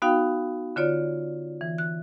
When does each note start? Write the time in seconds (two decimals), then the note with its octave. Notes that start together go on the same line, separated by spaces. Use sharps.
0.02 B3 D#4 F#4 F5 G5
0.76 D3 F4 C#5 D5
1.61 E3
1.78 F#6